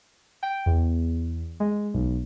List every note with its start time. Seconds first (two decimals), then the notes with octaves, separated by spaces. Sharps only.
0.43 G5
0.66 E2
1.60 G#3
1.94 B1